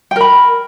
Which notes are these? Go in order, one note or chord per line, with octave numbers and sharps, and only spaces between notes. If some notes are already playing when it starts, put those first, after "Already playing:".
A#4 G5 B5